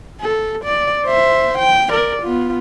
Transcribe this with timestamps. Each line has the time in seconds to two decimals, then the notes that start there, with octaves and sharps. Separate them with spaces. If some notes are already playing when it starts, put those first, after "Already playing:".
0.21 A4
0.64 D5
1.06 C5 E5
1.59 G5
1.89 A#4 D5
2.23 B3 F4